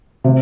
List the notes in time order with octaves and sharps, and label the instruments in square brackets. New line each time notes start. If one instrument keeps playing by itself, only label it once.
[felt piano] C3